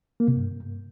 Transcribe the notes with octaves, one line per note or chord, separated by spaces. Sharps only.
A#3
C3
G2